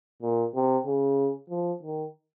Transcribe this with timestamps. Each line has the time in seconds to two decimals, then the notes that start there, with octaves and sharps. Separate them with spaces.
0.22 A#2
0.55 C3
0.86 C#3
1.50 F3
1.83 D#3